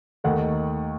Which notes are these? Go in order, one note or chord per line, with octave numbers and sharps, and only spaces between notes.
D#2 D#3 A3 F#5